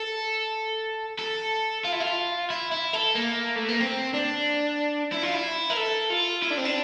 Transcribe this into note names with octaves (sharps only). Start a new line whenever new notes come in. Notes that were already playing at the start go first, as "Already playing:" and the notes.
Already playing: A4
A4
F4
E4
F4
E4
E4
A4
A#3
A3
A#3
C4
D4
E4
F4
E4
A#4
A4
F4
E4
D4
C4
D4